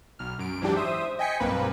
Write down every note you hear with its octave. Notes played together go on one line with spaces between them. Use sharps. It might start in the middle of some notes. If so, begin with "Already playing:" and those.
B1 F6
F#2 D7
G#2 E3 F#3 D4 G4
C5 E5 D#6
D#5 G5 G#5 B6 C#7
B1 G2 A#3 C4 B4